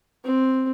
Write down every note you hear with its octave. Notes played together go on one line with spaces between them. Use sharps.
C4